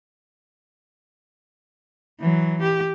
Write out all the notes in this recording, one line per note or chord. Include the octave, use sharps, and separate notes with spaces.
E3 F#3
G4